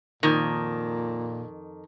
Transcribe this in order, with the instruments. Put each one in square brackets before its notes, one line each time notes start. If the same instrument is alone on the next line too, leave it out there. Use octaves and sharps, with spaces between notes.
[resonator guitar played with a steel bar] F2 D#3 [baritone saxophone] A#2